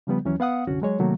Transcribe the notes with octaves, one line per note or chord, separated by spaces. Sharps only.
C#3 F3 G3 B3
D#2 E3 F#3 C#4
B3 F5 F#5 D#6
C2 F#2 D3 C#4 F#4
F#3 G#3 C#5
C3 D#3 F#3 A3 A#3